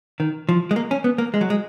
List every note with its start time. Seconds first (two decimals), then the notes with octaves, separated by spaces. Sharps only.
0.20 D#3
0.49 F3
0.71 G#3
0.76 A#3
0.91 C#4
1.04 B3
1.18 A#3
1.34 G#3
1.41 F#3
1.50 G#3